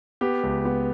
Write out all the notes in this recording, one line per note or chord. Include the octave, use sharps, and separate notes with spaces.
B3 G4
C#2
B3